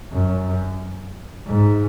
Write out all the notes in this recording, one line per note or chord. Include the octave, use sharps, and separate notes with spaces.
F#2
G#2